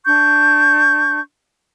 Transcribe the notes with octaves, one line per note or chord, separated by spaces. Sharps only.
D4 C#6 G6